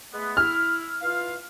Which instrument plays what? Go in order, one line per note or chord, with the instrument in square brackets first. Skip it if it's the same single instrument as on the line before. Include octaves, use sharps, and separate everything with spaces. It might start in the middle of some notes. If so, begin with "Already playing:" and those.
[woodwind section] G#3 A3 B3
[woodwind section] E4 [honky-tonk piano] F6
[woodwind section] E3 F4 F5